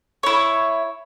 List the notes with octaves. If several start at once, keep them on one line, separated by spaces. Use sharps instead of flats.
E4 C#5